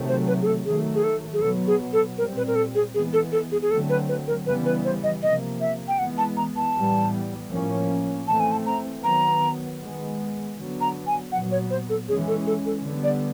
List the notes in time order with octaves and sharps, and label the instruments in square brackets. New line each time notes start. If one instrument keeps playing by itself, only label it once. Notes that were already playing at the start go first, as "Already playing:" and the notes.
Already playing: [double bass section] C3 D#3 F#3 A3
[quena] C5
B4
G#4
A4
[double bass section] D#3 F#3 A3 [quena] G#4
[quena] G#4
A4
G#4
[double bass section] B2 F#3 B3 [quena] A4
[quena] G#4
A4
[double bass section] A#2 G3 C4 [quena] A#4
[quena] B4
A#4
A4
G#4
[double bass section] E3 G#3 B3 [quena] G#4
[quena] A4
A4
G#4
G#4
[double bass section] D3 F#3 A3 C4 [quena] A4
[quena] B4
B4
A#4
[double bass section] C#3 E3 G3 B3 [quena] B4
[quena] B4
C5
D#5
[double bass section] C3 F3 A#3 [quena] D#5
[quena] E5
G5
[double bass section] E3 G#3 B3 [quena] F#5
[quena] A5
A#5
A5
[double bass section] A2 E3 G3 B3
A2 F3 A#3 C#4
[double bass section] E3 A3 C4 [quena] A5
[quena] G#5
A5
A#5
[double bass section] D#3 F#3 B3 [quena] A#5
[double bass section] D#3 G#3 B3
D3 F#3 B3
[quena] A#5
G#5
[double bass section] A#2 F#3 B3 [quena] F#5
[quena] C#5
C5
A4
[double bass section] E3 G#3 C#4 [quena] G#4
[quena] A4
A4
A4
[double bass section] D3 G3 B3
[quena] D5